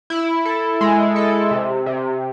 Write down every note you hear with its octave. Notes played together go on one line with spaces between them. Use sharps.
E4
A4
G#3
A4
C3
C3